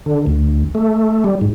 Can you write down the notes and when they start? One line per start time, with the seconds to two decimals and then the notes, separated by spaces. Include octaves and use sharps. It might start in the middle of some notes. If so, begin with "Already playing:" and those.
0.06 D3
0.27 D2
0.75 A3
1.24 G3
1.41 G#2